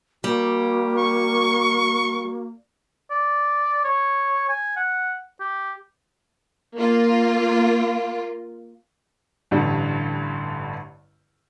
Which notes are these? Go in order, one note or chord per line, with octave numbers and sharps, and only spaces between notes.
G3 A#3 F#4
C#6
D5
C#5
G#5
F#5
G4
A#3 F4
A1 G2 D3 G3